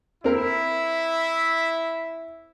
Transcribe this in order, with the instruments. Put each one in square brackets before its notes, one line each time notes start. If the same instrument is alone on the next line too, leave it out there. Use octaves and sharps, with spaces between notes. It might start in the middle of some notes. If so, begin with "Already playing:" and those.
[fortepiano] C4 A#4 [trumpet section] E4 E5